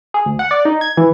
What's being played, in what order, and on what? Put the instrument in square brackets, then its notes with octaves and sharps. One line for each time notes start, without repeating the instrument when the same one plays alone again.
[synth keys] G#4
D2
F#5
D5
D#4
G#6
E3